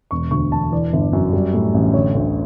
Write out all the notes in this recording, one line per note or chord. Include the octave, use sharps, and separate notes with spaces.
E1 C#6
D2 C#6
E1 A5
E3 D5
G1
F#2
G3
A2
A1
D3 C#5
D2